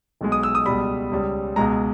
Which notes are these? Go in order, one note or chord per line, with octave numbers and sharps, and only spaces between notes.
B1 B2 G#3
D#6
E6
D#6
C#2 B2 G3 B5
C#2 C#3 G3
C#2 B2 G#3 A#5